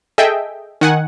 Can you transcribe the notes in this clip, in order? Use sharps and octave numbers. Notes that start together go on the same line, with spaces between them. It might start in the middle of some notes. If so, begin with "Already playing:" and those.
G#4 A4 D#5 E5 G5
D#3 F#5 G#5